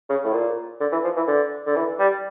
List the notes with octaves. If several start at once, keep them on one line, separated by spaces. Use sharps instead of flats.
C#3
A2
A#2
D3
E3
F3
E3
D3
D3
E3
G3